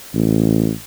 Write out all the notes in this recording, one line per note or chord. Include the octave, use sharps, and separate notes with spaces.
A1